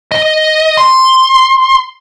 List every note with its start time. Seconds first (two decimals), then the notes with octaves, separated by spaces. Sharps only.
0.11 D#5
0.77 C6